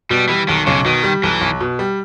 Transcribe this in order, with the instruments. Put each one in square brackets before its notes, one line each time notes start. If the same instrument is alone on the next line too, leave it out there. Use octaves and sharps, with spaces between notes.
[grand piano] B2 [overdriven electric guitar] G3
[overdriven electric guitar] E3 [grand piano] G3
[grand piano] B1 [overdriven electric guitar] D#3
[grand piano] B1 [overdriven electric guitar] C#3
[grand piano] B2 [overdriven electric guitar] D#3
[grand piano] G3
[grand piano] B1 [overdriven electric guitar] E3
[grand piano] B1
B2
G3